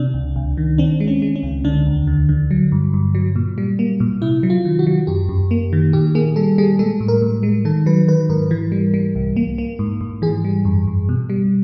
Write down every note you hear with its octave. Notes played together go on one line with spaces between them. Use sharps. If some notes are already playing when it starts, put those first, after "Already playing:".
Already playing: C3 D4
C#2
C#2
D#3
C4 D4
G#3
C#4
G#3
C#4
C#2
D3 D4
D#2
D3
D3
F#3
G2
G2
F#3
A#2
G3
A#3
A#2
C3 E4
F#3
F4
D#3
F#4
F#3
F#2 G4
F#2
A#3
D#3
A#2 G4
A#3 G#4
G3 A4
G3 G#4
G#3 A4
A2
A#4
A2
G#3
D#3 A4
F#3 B4
D#3 B4
G#2 A#4
E3
G3
G3
C2
A#3
A#3
G#2
G#2
E3 G#4
G3
F#2
F#2
B2
G3